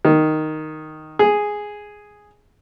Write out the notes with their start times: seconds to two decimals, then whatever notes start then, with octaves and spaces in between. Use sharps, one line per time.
0.05 D#3
1.19 G#4